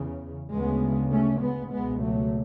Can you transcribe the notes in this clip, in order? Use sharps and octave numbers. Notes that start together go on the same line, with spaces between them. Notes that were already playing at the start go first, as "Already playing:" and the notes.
Already playing: E2 C#3
D2 C#3 G#3 B3
A3 C#4
G#3 B3
C#2 B2 G#3 B3
F#3 A3